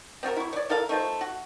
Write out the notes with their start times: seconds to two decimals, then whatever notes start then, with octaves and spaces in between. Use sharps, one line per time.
0.23 C4 F4 F#4 A#4
0.37 E4 C#6
0.53 C#5 D5
0.69 E4 A4 A#4 F5
0.89 A3 D#4 F4 C5
1.21 F#4